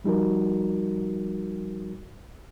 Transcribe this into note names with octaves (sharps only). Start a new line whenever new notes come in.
F3 G3 D#4 F#4 A#4